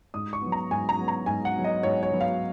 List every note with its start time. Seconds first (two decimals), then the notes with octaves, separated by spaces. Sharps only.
0.14 G#2 D#6
0.33 C#6
0.42 F#3 B3
0.52 A#5
0.71 G#2 G#5
0.89 A#5
0.99 F#3 B3
1.08 A#5
1.26 G#2 G#5
1.45 F#5
1.55 F#3 B3
1.64 D#5
1.83 G#2 C#5
2.03 C#5
2.12 F#3 B3
2.21 F5